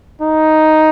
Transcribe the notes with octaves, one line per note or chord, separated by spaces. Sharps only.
D#4